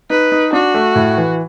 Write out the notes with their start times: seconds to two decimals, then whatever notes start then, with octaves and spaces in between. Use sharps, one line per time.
0.10 D#4 B4
0.32 D#4
0.53 D4 F#4
0.74 A3
0.96 A2
1.17 E3